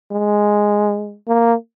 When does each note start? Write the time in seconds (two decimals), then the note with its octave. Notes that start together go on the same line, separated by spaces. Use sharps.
0.12 G#3
1.28 A#3